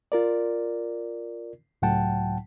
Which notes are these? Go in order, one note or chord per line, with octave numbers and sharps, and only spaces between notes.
F4 A#4 D5
C#2 A2 F#3 F#5 G5 A5